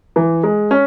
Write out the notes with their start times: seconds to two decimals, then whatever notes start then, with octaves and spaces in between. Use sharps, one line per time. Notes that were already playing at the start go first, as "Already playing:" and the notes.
0.16 E3
0.43 G#3
0.71 C#4